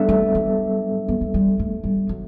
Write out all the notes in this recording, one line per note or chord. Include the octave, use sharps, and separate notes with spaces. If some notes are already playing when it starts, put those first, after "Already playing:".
Already playing: G3 B3 D4 A4 E5
A3
F#3
B3
A3
G3
A3
G3
F#3